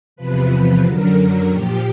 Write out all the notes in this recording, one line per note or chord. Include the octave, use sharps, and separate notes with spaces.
E2 C3 F3 B4
F#2 D3 F#3 A#4
A#2 F3 G4